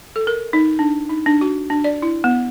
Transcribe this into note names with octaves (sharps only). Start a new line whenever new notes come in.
A4
A#4
D#4
D4
D#4
D4
F#4
D4
D5
E4
B3